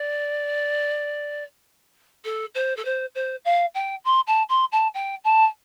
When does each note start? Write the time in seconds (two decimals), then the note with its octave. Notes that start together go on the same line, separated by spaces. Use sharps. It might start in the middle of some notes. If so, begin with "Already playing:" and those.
Already playing: D5
2.25 A4
2.55 C5
2.76 A4
2.85 C5
3.15 C5
3.45 F5
3.74 G5
4.05 C6
4.27 A5
4.49 C6
4.72 A5
4.94 G5
5.24 A5